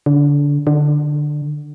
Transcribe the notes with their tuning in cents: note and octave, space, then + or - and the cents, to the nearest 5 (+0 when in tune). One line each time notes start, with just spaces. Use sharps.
D3 -25
D3 +15